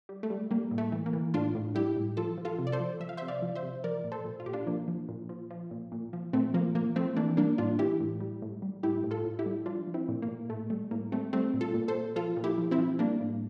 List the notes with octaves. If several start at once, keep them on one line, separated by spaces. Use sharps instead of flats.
G3
A3
G3
G3 A#3
A2
A3
E3
A#3
E3
A2 D4 F4
A2
G3 E4 G4
A2
F3 F4 A4
F3
F4 A4
C3
D5
A4 C5
F3
F3 E5
F5
C5 E5
C3
D5 F5
F3
C5 E5
C3
F3 A#4 D5
A#2
A4 C5
A#2
F4
A#2 G4
D4 F4
F3 A#3 D4
F3
A#2
F3
F3
A#2
A#2
F3
A#2 A3 C4
F3 A#3
F3 A#3
F3 A3 C4
E3 A#3 D4
G3 A#3 D4
A2 D4 F4
E3 E4 G4
A2
G3
A2
G3
A2 E4 G4
A2
F4 A4
A2
E4 G4
G3
F3 D4 F4
F3
C4 E4
A#2
A#3
A#2
A2 A3
G3 A3
A2 A#3
G3 A3 C4
G3 A3 C4
A#2
F4 A4
A#2
A4 C5
A#2
F3 F4 A4
A#2
E4 G4
F3
C4 E4
F3
G3 A#3 D4
A2